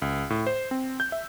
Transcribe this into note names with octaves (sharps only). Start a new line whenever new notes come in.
C#2
A2
C5
C4
G6
E5